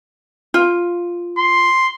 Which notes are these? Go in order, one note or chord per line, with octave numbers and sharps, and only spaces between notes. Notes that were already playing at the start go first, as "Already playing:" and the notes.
F4
C6